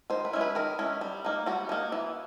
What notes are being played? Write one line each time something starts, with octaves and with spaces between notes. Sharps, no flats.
D#3 C5
B4
G#3 C#4 E4
B4
D#3 A#4
G#3 C#4 E4
G3
A#3 D#4
G3 F#4
A#3 D#4
E3